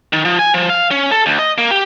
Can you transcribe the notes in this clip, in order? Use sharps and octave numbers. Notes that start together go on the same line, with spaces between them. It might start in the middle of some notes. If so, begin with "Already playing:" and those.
D#3
F3
G#5
F3
F5
C#4
A4
D2
D#5
A#3
G4